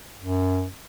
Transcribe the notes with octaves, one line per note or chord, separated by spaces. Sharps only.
F#2